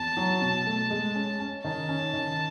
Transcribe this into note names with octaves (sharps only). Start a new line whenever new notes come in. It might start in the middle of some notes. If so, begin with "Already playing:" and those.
Already playing: E2 A5
F#3
B2
A3
G#3
C#4
C#4
D#3 A5
C#4
D#3